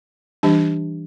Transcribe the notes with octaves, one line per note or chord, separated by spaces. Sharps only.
E3 G3 D4 G4